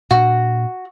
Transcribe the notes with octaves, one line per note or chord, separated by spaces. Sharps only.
A#2 D4 F#4